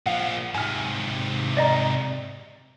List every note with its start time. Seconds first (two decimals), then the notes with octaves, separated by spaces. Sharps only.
0.06 A#2 F3 F5 F#5
0.55 G#2 C3 G#5 F6
1.57 D5 D#5 A#5